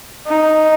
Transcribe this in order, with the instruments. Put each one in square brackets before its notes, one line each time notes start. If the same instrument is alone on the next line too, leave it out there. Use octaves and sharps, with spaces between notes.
[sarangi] D#4